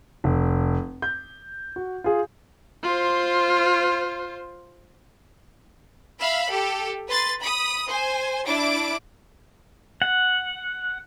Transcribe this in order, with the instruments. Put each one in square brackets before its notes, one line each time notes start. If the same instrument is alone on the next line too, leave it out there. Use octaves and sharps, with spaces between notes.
[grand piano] F1
G6
F#4
F4 G#4
[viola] F4 C5
[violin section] E5 F5 B5
G4 A4
B4 C6 A6
B5 D#6
C5 G#5
D4 E4 D6 D7
[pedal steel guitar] F#5